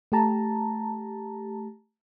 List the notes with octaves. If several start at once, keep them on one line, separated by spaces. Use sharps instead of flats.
A3 G4 A5 A#5